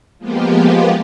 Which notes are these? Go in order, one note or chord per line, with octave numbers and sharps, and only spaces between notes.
F3 G#3 A#3 B3 F4 G4